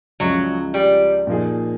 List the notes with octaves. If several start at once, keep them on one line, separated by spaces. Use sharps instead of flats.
C#2 C#3 F3 F#3 G#3
G3
A#2 F3 A#3 D#4 G#4